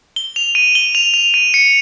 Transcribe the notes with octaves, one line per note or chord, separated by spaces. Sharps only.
G7
F7
D#7
G7
F7
F7
D#7
C#7